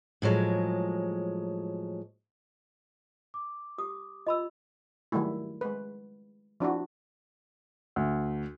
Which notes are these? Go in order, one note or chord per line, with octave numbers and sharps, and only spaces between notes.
A2 F3 F#3 G#3
D6
G4 D#6
F4 D#5 B5 E6
D#3 F#3 G3 A3 E4
G#3 B4
F3 D4 E4 F#4
D2